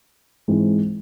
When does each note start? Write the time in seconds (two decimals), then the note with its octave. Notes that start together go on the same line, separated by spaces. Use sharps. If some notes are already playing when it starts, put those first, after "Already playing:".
0.48 G#2 E3 G#3 C4